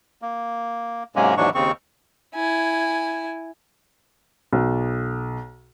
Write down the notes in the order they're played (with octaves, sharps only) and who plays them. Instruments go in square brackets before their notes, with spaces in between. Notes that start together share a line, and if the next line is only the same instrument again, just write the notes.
[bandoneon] A#3
G#2 C3 F#3 G#3 A#3 C#4
D#2 G#2 E3 F#3 D4 C#6
D#2 C#3 C4 C#6
[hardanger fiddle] E4 G#5
[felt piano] B1